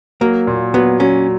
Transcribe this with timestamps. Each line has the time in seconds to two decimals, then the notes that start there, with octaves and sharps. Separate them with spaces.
0.21 F#3 A#3
0.47 A#2
0.74 F#3 B3
1.00 F#3 C#4